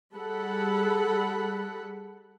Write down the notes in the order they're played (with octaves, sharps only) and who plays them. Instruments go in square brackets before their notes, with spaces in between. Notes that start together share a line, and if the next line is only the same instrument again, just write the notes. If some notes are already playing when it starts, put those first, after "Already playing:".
[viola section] G3 G#4 A4 F#5 B5